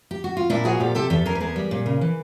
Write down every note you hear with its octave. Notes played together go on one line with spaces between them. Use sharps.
G4
F#4
F4
A#2 D4 E4
F3 F#4 G#4
A#2 G4 A4
C3 G4 A4
E2 G4 A4
E2 G#4 A#4
B4
B3 G#4 A#4
G3
A#2
C#3
E3